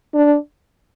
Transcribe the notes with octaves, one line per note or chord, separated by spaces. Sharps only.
D4